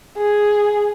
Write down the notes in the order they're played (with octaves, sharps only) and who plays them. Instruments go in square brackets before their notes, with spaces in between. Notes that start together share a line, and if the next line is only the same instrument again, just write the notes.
[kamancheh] G#4